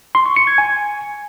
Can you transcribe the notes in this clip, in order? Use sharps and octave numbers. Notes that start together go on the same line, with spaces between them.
C6
C#6
C#7
G#6
G#5